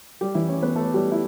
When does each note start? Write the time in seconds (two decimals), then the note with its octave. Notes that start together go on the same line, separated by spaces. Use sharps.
0.21 G3 G4
0.35 E3 E4
0.48 C#4 C#5
0.62 B3 B4
0.76 A3 A4
0.94 G3 G4
1.12 E4